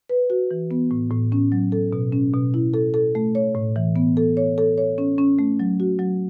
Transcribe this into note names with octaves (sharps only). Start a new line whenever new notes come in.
B4
F#4
E3
B3
A2
A2
C#4
F#3
A4
B2
C#4
B2
E4
A4
A4
A3
C#5
A2
E3
B3
A4
C#5
A4
C#5
C#4
C#4
A3
F#3
F#4
F#3